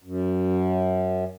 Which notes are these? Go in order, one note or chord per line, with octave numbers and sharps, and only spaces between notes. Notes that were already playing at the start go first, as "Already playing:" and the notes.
F#2